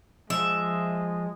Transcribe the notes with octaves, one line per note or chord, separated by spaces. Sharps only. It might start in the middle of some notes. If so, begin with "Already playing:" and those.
F3 G#3 E5